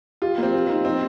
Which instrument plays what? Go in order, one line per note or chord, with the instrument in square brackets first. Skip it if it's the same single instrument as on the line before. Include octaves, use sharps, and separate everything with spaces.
[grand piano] F4 [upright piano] G4
[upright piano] A#3
[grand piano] C4
[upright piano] G4
D#4
[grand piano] C4 [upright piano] D#4